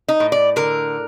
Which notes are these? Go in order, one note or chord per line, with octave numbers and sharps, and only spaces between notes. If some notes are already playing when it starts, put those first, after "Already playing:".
D#4
A2
D5
D3 A#4